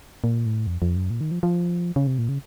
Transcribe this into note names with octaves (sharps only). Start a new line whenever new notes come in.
A#2
A2
F2
F2
F#2
A#2
D#3
F3
F3
C#3
C3
A#2
C#3